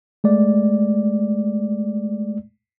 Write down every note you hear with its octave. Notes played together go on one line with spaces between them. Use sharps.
G#3 A3 D5